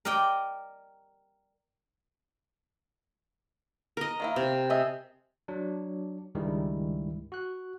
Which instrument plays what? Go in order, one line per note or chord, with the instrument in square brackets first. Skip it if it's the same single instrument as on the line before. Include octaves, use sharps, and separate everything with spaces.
[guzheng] A#4 D5 D#5 G5
[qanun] A#4 D#5
[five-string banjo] D#3 A#3 E4
[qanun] C3
[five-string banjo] G#4 D#5 E5
[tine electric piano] F#3 D4
C#2 G2 D#3 G3 G#3 E4
F#4 F#6